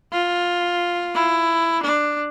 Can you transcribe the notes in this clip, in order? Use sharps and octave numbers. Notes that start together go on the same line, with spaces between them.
F4
E4
D4